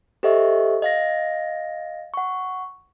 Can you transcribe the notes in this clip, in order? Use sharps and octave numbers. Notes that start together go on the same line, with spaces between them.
G4 A4 C5 D#5 E5 C#6
D#5 F5 A#6
F#5 C#6